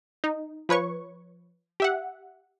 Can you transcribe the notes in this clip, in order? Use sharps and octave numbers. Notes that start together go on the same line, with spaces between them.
D#4
F3 B4 C#5 C#6
G4 E5 F#5